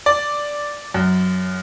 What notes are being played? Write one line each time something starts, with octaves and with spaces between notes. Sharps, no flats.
D5
F#2